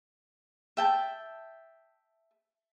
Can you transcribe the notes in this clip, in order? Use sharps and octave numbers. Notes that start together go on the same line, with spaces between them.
E5 G5 A5